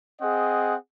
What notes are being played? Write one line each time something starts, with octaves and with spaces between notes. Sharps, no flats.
C4 G#4 D#5 F#5